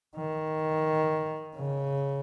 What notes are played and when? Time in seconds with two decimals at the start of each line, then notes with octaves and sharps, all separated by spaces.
0.17 D#3
1.57 C#3